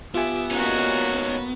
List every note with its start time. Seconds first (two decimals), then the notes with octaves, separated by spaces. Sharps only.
0.15 B3 F4 G4 E5 G#5 D6
0.51 A#3 C#4 D#4 F#4